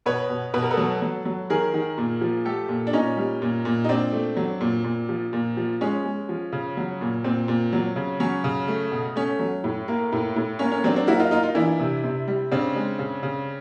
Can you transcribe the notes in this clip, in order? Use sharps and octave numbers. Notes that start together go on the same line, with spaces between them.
B2 B4 C#5
B2
B2 B4
A#4
A4 B4
F#3
F#3
F#3
D#3 G#4 A#4
D#3
A#2
F3
A3 G4 A4
A#2
D4
A#2 C#4 D#4
G3
A#2
A#2
D#4
A#2 C4 D4
A3
F#3
A#2
A#2
F3
A#2
F3
G#3 C#4
G#3
F3
C#3
F#3
A#2
A#2 C4
A#2
F#3
C#3
F#3 C#4
C#3
A3
B2
A3 C#4
F#3
A2
A#3
A2
A2
A#3 C#4
C#4
F#3 C4 D4
C4 D4
A#3 E4 F#4
D#4 F4
A#3 D#4 F4
D#4 F4
E3 D4 E4
C3
C3
G3
C#3 C4 D4
G#3
C#3
C#3